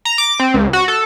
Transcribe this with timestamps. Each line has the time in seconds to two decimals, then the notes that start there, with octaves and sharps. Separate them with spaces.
0.05 A#5
0.18 D6
0.40 C4
0.54 C#2
0.73 F#4
0.88 A4